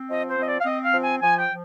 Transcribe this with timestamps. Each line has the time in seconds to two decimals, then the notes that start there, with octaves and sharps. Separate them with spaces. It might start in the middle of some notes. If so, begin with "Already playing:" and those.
Already playing: C4
0.09 F3 D#5
0.27 C5
0.37 C4 D#5
0.46 D5
0.61 F5
0.65 C4 D#5
0.84 F5
0.93 F3
1.02 G#5
1.21 F3 G#5
1.39 G5
1.49 F3